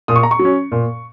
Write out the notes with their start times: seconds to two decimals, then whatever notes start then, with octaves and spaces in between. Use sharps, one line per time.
0.08 A#2 D#6
0.16 C#6
0.23 A#5
0.31 C#6
0.39 F#3
0.45 C#4
0.72 A#2